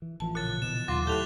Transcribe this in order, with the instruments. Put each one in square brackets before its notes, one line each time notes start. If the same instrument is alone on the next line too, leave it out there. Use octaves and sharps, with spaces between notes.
[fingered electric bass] E3
[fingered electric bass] A1 E3 F3 [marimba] A5
[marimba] A#2 C#3 [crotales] F#6 A6
[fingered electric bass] B2 E3 [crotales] E7
[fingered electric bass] D#2 [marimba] F#3 [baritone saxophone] F4 [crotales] D6 E7
[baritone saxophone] A2 [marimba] G4 [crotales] F#6 F7 G7